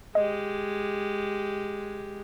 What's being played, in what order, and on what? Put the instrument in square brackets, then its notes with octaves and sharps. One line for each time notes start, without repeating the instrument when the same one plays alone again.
[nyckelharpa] G#3 G4 [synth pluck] D#5